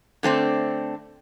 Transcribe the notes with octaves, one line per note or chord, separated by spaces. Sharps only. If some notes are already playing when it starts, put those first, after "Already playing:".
D3 A3 C4 D4